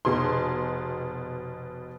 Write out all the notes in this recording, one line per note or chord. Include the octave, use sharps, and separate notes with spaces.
F1 B2 G#4 C6